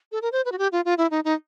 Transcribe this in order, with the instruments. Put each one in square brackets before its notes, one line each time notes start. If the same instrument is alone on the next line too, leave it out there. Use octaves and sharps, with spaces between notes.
[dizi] A4
A#4
C5
B4
F#4
G4
F4
F4
E4
D#4
D#4